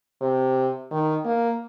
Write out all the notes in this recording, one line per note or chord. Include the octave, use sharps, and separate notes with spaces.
C3
D#3
A#3